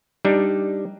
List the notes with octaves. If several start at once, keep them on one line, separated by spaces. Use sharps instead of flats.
G3 D4 D#4